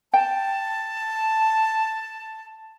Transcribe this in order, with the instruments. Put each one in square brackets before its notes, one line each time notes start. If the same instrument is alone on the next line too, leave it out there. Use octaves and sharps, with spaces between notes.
[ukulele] G5 [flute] A5